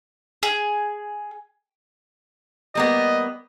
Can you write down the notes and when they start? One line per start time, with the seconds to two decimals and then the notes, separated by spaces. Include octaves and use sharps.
0.43 G#4
2.75 G3 A#3 B3 D#5